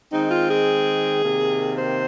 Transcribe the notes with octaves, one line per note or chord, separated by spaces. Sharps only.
D#3 G#3 C4 D#4
F4
G#4
C3 D#3 A#3
C5